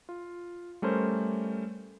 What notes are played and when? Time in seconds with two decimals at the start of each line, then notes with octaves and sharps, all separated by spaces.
0.09 F4
0.82 G3 A3 C#4 A#4 C5